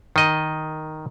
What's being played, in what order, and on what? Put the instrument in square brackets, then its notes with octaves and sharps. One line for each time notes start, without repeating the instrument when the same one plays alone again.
[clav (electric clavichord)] D#3 D#5